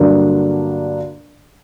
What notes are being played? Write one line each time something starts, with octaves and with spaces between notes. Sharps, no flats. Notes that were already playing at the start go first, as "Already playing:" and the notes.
Already playing: G2 D3 F#3 A#3 D4